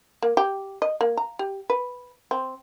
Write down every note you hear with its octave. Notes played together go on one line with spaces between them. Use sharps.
A#3
G4
D#5
A#3
A#5
G4
B4
C4